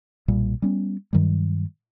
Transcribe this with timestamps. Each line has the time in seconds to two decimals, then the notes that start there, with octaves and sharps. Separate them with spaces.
0.28 B1 A#2 G3
0.62 G3 B3 C#4
1.13 G2 D#3 F#3 G3